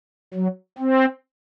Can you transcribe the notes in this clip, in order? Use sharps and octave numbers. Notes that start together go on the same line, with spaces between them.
F#3
C4